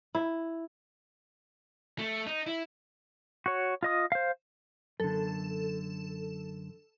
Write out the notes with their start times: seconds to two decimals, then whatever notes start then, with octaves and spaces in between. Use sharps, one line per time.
0.15 E4
1.99 A3
2.27 D#4
2.47 E4
3.46 F#4 C#5
3.83 F4 D#5 D#6
4.12 C5 F5
5.00 F#2 D3 A4